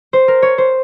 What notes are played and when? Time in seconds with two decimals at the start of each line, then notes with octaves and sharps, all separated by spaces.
0.13 C5
0.28 A#4
0.42 C#5
0.58 C5